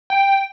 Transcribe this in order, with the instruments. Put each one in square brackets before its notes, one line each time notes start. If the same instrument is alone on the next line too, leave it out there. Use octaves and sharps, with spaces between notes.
[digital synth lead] G5